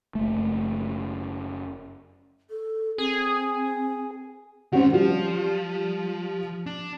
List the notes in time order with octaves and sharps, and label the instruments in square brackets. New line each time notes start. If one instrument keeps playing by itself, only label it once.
[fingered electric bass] F#1 A3
[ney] A4
[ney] C4 [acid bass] G#4
[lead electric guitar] D#3 G#3 [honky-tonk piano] C4 C#4 F#4
[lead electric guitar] F3 [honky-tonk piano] G3 F4
[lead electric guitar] D4